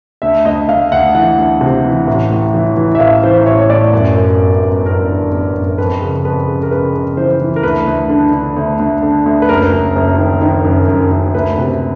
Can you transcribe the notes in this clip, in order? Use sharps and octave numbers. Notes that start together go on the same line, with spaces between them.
D2 E5
D2 D#5
D2 F5
D2 F#5
E3 F#5
D2
C3
E3
A1
A2
E3
E3
E5
A1 F5
E3 C5
A1 C#5
C#5
A2 D5
F#2
F#2
G1
G1
G1 A#4
D3
G1
F#2
A#4
F2 B4
C#3
F2 B4
C#3
A#4
C#3 B4
C#3
E3 C5
E3
A#4
D2 B4
D2
D3
D3
D2
D2
D3
D2
B4
F#1 A#4
F#1
F#1
D#3
D#3
F#2
F#2
F#2
D2 B4
C3